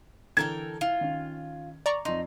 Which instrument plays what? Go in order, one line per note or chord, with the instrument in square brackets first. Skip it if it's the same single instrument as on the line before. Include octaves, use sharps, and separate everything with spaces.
[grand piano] D3 E3 [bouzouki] A4 A#4 G5 [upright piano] G#6
[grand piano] E4 [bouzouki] F4
[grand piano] D#3 C#4
[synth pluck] D5 A#5 C#6
[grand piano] F2 C6 [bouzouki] D#4